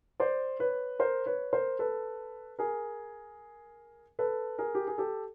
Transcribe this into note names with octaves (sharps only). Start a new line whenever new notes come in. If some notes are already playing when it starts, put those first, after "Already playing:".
C5 D5
B4 C#5
A#4 C5
B4 C#5
A#4 C5
A4 B4
G#4 A#4
A4 B4
G#4 A#4
G4
G#4
G4 A4